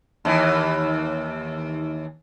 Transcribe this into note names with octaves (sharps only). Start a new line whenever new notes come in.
D#2 E3